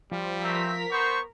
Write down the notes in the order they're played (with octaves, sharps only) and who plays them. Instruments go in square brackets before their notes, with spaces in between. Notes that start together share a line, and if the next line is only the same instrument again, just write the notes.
[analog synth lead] F3 [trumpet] G3
[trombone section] B1 A3 C4 [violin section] A#4 B6
[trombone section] B3 C5 [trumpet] C#6